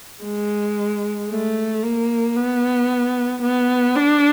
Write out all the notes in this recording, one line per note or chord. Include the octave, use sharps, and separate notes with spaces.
G#3
A3
A#3
B3
B3
D4